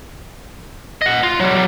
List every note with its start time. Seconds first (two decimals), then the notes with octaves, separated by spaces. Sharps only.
1.02 D#5 F#5
1.23 F4
1.40 F#3 G3